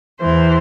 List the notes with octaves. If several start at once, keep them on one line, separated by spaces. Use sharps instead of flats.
E2 E3 C5